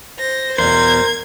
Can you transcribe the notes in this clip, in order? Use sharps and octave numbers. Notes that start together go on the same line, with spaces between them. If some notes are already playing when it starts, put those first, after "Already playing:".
C5 A#6
E2 B2 A#4 C5 G#6